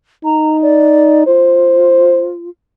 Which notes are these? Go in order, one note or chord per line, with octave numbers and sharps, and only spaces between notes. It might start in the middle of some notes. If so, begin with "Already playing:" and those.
D#4 A#5
D5
F4 C5